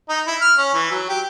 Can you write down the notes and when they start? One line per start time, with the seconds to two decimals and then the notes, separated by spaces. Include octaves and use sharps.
0.09 D#4
0.27 E4
0.41 F6
0.58 C#4
0.74 E3
0.91 F#3
1.09 G4